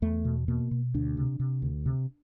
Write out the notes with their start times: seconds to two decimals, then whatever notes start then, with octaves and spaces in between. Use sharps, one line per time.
0.02 E2 A3
0.25 B2
0.48 B2 A#3
0.71 B2
0.94 D2 D4
1.17 C3
1.40 C3
1.62 D2
1.86 C3